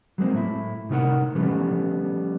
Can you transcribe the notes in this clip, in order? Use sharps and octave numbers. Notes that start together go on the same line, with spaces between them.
F#3 G#3 A#3 C4
A2 E4
A2 C3 D#4 F4 A#4 F#5
E3 F3 G3 A3 B3 C#4